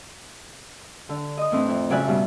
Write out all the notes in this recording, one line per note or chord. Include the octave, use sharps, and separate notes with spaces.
D3
D#5 D#6
A2 E3 C4 D4
F2
C#3 F#3 D5 E5 G#5 F#6
G2 B2